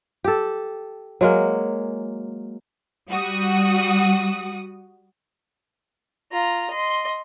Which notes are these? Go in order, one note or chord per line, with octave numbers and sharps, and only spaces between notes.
G4 A4
F#3 G#3 A#3
G3 F#4 D#6
F4 A#5
D#5 C6